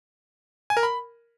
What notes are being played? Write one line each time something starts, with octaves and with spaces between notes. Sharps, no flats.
G#5
A#4
B5